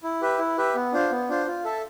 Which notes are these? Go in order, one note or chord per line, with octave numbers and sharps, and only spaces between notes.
E4
G4 B4 E5
E4
G4 B4 E5
B3
D4 F4 C5
B3
D4 F4 C5
F4
A4 E5 A5